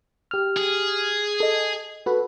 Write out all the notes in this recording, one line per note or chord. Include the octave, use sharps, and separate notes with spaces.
G4 F6
G#4
A4 D#5
F#4 A4 B4